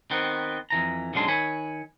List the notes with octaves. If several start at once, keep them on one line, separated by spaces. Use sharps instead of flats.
D#3 B3 C4
F2 E3 A#5
B1 F#2 F#3 G#3 D4 C6
D#3 C#5 G#5 B5